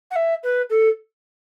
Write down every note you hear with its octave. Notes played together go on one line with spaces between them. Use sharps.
F#5
E5
B4
A4